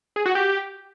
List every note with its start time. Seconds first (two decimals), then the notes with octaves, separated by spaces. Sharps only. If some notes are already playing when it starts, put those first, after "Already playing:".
0.16 G#4
0.26 F#4
0.35 G4